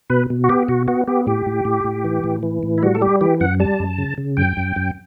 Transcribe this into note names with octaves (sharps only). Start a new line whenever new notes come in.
B2 B4
B2
F#4
B3 G4
B2 F#4
B3 F#4
B3 G4
A2 G4
A2
A2
A2
E3
A2
E3
A2
E4
G3 F#4
A4
G3 G4
E3 G4
F#2 F#5
G3 A5
F#2
C#3
C#3
F#2 G5
F#2
F#2